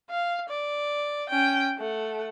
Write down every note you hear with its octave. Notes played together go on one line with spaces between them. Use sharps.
F5
D5
C#4 G5
A3 F#5